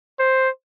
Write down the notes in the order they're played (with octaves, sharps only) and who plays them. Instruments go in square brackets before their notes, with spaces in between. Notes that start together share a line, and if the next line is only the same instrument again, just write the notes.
[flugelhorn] C5